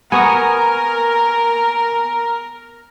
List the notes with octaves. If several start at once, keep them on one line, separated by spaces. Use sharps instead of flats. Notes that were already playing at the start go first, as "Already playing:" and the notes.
B3 A#4 G#5 C#6 D#6